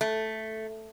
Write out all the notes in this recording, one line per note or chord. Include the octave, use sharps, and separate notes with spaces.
A3